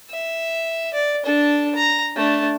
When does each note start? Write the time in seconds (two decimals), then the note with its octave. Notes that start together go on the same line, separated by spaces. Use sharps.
0.10 E5
0.94 D5
1.24 D4 A4
1.75 A#5
2.16 A3 D4